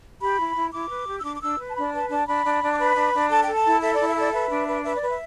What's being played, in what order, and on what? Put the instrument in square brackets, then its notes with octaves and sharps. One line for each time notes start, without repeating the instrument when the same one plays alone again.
[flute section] G4 B5
E4
E4
E4 D6
B4
G4
E6
D4 D6
D6
D4 E6
B4
A5
D4 B5
B4 A5
D4 A5
D4 B5
D4
D4
D6
B4 B5
D4
D4
A4 A5
A4 G5
A5
E4
A4 E5
E4 D5
E5
A4 D5
B4 E5
D4
B4
B4 E5
D5
B4
E5